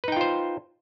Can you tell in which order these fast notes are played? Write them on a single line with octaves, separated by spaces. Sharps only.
B4 D#4 G5 F4 C5